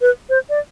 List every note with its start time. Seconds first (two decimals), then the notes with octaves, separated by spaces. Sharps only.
0.01 B4
0.30 C5
0.50 D5